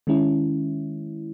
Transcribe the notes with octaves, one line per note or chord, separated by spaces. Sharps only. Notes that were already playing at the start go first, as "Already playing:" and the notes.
D#3 G#3 C#4 E4